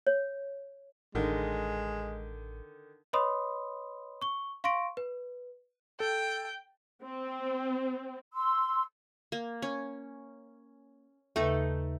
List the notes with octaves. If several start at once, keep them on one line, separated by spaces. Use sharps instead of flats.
C#5
A1 D3 D#3 G#3
B4 C#5 D#5 B5 C6 D#6
C#6 G7
F5 C6 C#6 A#6 D7
B4
A4 G5
C4
C6 E6
A#3
C#4
D#2 C#3 A3 D#4 A4 B4